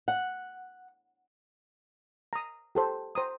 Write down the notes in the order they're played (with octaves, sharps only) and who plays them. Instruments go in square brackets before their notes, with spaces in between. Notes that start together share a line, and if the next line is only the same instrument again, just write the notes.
[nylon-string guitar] F#5
[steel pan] A#5 D#6
G4 A4 C5 G5
C5 A#5 D#6